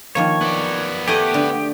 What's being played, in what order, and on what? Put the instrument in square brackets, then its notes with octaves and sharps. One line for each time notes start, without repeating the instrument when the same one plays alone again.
[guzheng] D#3 F3 A#3 [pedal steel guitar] C#5
[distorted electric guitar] B3 D5
[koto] A3 G#4 D#5 [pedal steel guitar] G4
[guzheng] D3